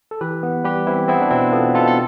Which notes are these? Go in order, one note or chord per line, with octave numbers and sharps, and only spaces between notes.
A4
E3 G4 B4
B3
G3 G4 B4
E3 C4 E4
B3 C4 E4
D4
B2 C4 E4
B3 F4 A4
B2 F4 A4
A4